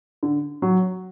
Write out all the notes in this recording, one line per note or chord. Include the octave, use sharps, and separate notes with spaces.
D3
F#3